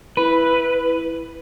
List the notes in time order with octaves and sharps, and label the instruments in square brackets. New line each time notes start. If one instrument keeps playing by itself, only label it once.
[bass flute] E4 [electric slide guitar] B4